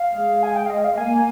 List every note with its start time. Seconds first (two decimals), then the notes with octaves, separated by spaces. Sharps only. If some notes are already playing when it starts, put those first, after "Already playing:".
Already playing: F5
0.13 G#3
0.43 G#5
0.56 G5
0.66 F5
0.70 D#5
0.84 F5
0.98 A#3 G#5